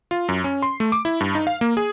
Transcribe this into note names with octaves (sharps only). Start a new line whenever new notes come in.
F4
F#2
C#4
C6
A3
D6
E4
G2
D#4
F5
A#3
G#4